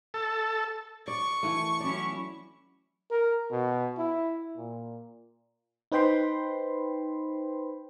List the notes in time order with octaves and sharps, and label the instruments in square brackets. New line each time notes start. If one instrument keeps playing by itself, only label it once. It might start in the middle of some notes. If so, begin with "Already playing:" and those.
[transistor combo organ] A4
[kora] D5 [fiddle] C#6
[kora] E3 A3
[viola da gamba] F#3 C#4 E4 [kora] D5
[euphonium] A#4
B2
E4
A#2
[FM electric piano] D#4 B4 C5 G5 B5 C6